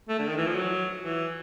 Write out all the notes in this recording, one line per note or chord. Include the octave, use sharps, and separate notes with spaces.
A3
D3
D#3
E3
F3
F#3
E3